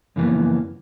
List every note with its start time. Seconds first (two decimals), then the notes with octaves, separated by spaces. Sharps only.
0.16 F#2 C#3 E3 F3 A#3 B3